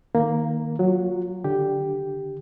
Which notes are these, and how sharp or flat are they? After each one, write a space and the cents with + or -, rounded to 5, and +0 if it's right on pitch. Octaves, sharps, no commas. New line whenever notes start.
D#3 +0 A#3 +0
F#3 +0 F4 +25
D3 +0 G4 +0